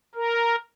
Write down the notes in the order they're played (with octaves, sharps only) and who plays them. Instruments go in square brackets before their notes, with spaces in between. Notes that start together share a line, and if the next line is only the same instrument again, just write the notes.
[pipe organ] A#4